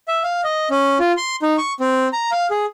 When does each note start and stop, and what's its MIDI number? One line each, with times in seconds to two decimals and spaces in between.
0.08 0.23 76
0.24 0.41 77
0.44 0.69 75
0.71 0.98 61
0.99 1.12 65
1.17 1.36 84
1.42 1.57 63
1.58 1.73 85
1.80 2.08 60
2.13 2.31 82
2.32 2.47 77
2.51 2.65 68